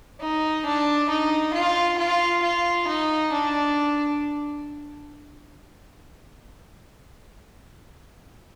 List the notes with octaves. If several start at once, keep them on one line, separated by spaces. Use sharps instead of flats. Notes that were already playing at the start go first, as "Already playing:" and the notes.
D#4
D4
D#4
F4
F4
F4
D#4
D4